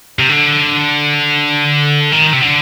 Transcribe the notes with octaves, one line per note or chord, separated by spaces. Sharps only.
C3
D3
D#3
C3
D3